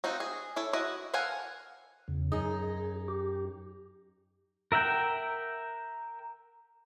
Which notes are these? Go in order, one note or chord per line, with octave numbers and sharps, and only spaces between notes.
C4 D#4 F4 F#4
G#4
E4 A4 C#5
E4 F#4 D#5
A4 A#4 F5 F#5 G#5
E2 C#3
F#2 D#4 G#4
G4
A#4 E5 F#5 G5